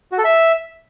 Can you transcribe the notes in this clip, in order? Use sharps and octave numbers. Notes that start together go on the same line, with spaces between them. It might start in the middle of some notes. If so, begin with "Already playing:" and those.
F#4
A4
E5